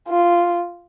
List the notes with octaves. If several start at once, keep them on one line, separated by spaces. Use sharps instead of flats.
F4